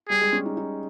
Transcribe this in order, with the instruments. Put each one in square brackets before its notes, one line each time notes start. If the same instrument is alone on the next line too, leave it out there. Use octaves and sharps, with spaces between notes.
[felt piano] G3 [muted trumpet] G#4
[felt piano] G#3
C#4
D#4
D#4